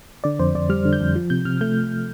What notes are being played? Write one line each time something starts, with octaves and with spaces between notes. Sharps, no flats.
D3 D5
F2 C5
F2 D5
G3 F6
D3
G6
F2
F3
C3 G6
C3 F6
A3 G6